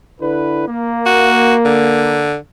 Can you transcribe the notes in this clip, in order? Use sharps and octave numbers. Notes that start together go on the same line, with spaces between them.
D3 E4 B4
A#3
F#4
D3